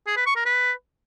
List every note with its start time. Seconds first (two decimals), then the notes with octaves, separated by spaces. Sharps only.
0.07 G#4
0.16 B4
0.26 C#6
0.36 A#4
0.45 B4